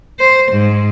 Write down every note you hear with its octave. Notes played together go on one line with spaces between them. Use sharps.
C5
G#2